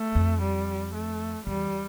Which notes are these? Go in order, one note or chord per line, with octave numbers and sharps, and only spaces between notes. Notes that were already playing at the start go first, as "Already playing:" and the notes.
Already playing: A3
F2
G3
A3
E2 G3